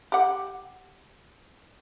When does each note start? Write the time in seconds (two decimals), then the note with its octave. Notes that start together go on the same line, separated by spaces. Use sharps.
0.12 G4 F#5